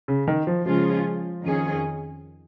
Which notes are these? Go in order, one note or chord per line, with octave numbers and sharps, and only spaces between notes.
C#3
D#3
F3
C#3 F3 G#3 C#4 F4 G#4
F2 D#3 C#4 G#4